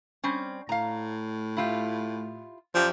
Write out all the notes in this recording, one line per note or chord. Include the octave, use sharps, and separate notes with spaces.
G3 C4 C#4
A2 F5 A#5
E4 F4 G4
F#2 F3 G4 D5